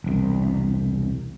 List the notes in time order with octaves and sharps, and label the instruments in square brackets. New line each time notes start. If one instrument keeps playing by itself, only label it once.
[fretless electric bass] E1 C2